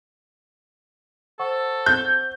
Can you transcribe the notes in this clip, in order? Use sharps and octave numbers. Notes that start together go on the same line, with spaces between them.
A4 C5 F#5 C#6
G6